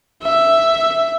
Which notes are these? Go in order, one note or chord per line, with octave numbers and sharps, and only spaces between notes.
E5